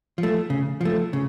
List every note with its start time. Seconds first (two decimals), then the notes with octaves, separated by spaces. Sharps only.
0.18 F3
0.23 A3
0.50 C#3
0.81 F3 A3
1.13 C#3